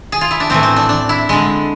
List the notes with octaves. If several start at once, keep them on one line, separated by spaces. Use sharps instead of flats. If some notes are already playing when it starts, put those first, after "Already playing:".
G#4
F4
E4
D4
A2 E3 A3 C4
C4
D4
D4
E4
D3 G#3